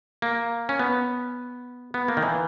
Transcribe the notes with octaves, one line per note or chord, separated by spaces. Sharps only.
A#3
C#4
B3
B3
A#3
D#3
E3